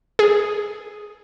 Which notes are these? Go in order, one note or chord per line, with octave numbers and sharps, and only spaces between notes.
G#4